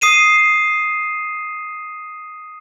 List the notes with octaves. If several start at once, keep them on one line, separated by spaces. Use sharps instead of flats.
D#6 C7 D#7 E7